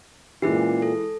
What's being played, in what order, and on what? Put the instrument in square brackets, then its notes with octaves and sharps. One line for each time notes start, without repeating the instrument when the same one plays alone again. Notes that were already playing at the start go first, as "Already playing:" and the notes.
[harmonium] A#2 [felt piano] E3 G#3 [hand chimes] C#4 G#4 C7
[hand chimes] A4